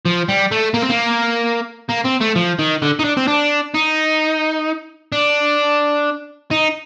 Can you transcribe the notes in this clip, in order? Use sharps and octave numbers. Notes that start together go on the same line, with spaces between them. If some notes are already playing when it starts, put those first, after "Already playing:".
F3
G3
A3
A#3
C4
A#3
A#3
C4
A3
F3
D#3
D3
D#4
D4
C4
D4
D#4
D4
D#4